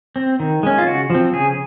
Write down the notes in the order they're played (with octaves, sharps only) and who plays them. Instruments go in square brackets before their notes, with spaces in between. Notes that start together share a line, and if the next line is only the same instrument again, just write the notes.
[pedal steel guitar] C4
D#3
G#3 C#4
F4
C#3 F#4
F3 C4
C#3 G#4